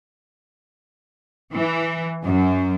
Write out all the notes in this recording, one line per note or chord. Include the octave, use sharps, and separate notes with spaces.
E3
F#2